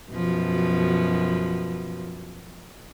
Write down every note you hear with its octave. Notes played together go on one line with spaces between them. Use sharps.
F#2 B2 F3